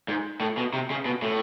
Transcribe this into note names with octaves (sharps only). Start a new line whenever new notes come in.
G#2
A2
B2
C3
C#3
B2
A2